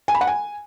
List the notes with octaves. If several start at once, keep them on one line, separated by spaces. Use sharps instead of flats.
G#5
B5
F#5
G#5